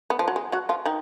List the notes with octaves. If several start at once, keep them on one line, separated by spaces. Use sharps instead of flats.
B3
F3
F#3
G#3
F#3 F#4
F3 F4
D#3 D#4